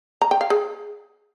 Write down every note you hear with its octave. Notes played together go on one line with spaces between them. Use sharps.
A#5
G5
F5
G#4